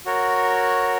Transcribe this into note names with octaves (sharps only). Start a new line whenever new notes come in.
F#4 A#4 C#5